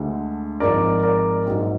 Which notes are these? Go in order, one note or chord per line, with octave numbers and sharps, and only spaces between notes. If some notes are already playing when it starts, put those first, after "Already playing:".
Already playing: D2 D3 G#3
G#1 G#2 F3 G#3 A#4 D5
A#4 D5
A#1 G#2 F#3